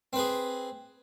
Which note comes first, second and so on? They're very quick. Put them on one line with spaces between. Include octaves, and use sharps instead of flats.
C4 B4 G#4